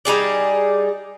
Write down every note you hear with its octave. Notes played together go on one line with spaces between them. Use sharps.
G3 D#4 G#4 D5